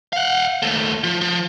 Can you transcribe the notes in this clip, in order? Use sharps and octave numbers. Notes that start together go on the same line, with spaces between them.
F5 F#5
D#2 A3
F3
F3